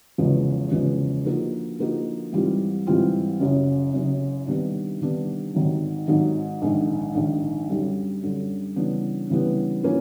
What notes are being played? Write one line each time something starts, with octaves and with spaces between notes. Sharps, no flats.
F#1 E2 C#3 F3 G#3
F#1 E2 C#3 F3 G#3
D3 F3 A#3 D#4 F#4
D3 F3 A#3 D#4 F#4
G#2 E3 G3 C4 F4
G#2 E3 G3 C4 F4
F#1 F#2 C#3
F#1 F#2 C#3
C3 D#3 G3 B3 D4
C3 D#3 G3 B3 D4
G#1 G#2 D#3 F#3
G#1 G#2 D#3 F#3
A#1 G#2 D#3
A#1 G#2 D#3
F#2 D3 G3
F#2 D3 G3
C#3 E3 G3 B3 D4
C#3 E3 G3 B3 D4
F3 A#3 C#4 E4